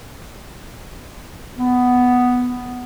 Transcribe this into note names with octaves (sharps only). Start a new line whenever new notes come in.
B3